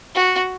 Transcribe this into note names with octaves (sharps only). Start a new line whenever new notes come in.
F#4